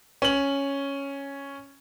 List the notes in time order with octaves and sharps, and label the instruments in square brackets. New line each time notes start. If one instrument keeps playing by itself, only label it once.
[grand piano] C#4 F#7